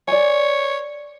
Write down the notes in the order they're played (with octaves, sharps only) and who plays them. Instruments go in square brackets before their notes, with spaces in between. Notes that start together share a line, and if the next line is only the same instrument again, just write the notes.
[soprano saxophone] C#5 [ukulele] D5 G#5